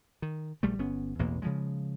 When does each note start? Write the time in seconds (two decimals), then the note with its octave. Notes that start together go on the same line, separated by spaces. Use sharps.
0.22 D#3
0.63 A#1 G3 A3
0.79 G1 B3 C#4
1.19 A1 E2 B2 A#3
1.42 C#3 F3 G#3